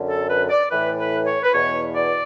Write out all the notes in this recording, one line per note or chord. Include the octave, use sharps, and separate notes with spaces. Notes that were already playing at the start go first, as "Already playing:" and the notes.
Already playing: F#2 D3
A4
B4
D5
A2 E3 B4
B4
C#5
B4
E2 B2 C#5
D5